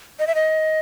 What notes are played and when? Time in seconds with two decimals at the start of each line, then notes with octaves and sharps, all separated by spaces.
0.19 D#5
0.27 E5
0.35 D#5